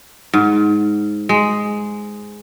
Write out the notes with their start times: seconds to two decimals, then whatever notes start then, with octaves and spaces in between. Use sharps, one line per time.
0.34 G#2
1.29 G#3